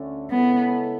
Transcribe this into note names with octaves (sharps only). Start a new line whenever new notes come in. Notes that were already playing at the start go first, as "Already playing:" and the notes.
Already playing: D2 D3 A3 C#4
C#3 G#3 B3 C#4 E4 A4